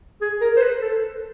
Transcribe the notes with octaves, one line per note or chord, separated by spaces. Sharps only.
G#4
A#4
C5
B4
A4